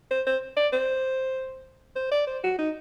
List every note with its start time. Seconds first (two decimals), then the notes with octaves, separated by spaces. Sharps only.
0.11 C5
0.27 C5
0.57 D5
0.73 C5
1.96 C5
2.11 D5
2.27 C5
2.44 F#4
2.59 D#4